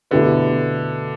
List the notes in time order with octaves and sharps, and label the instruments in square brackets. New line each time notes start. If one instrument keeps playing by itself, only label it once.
[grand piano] B2 A3 E4 G4 B4 [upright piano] D3